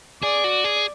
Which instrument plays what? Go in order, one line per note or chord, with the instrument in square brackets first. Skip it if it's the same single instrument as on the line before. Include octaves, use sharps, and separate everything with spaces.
[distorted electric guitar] G#4 [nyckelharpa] D5
[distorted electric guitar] F#4
G#4